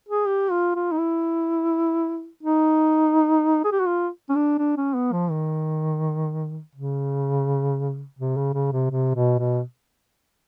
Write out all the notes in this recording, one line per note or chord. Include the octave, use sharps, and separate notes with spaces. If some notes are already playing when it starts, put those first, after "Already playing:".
G#4
G4
F4
F4
D#4
E4
D#4
G#4
G4
F#4
F4
C#4
D4
D4
C#4
B3
F3
D#3
C#3
C3
C#3
C#3
C3
C3
B2
B2